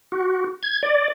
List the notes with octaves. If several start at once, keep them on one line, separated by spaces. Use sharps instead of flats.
F#4
G#6
D5